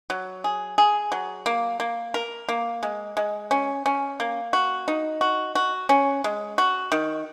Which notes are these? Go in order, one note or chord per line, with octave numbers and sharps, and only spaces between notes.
F#3
G#4
G#4
F#3
A#3
A#3
A#4
A#3
G#3
G#3
C#4
C#4
A#3
F#4
D#4
F#4
F#4
C#4
G#3
F#4
D#3